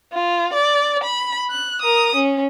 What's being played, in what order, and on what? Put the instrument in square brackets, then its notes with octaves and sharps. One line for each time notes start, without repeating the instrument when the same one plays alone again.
[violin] F4
D5
B5
F#6
A#4 D#6
C#4